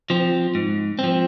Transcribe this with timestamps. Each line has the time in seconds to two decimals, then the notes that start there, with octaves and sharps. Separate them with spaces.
0.10 F3 C4
0.55 G#2
0.99 F3 C4